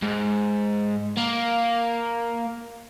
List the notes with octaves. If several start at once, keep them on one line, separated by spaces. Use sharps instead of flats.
G#2
A#3